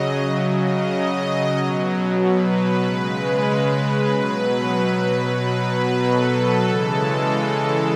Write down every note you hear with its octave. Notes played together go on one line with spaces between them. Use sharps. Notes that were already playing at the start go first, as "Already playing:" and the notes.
Already playing: C#3 F#3 D#5
C#3 F#3 E5
D#5
B2 F#3
B4
C#3 G#3 B4
B2 F#3 B4
B2 F#3 B4
A4
C#3 E3 G#3 A4